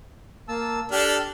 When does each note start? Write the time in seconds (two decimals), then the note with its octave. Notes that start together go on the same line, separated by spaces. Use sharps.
0.48 A#3 A5 E6
0.92 D4 G4 A4 F6